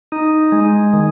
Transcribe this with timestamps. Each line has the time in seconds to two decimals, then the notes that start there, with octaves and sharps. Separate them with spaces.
0.12 D#4
0.52 G#3
0.93 D#3